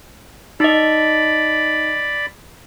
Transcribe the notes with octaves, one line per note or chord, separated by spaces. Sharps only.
D#4 D5 D#5 B5